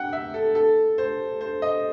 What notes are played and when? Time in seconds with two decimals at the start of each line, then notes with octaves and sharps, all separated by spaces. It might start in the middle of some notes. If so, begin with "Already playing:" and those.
Already playing: F#5 G5
0.13 E5
0.34 A4
0.55 A4
0.98 C5
1.41 C5
1.62 D#5